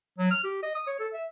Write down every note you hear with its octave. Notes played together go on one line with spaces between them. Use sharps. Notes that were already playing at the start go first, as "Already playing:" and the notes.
F#3
F6
G4
D#5
D#6
C#5
A4
E5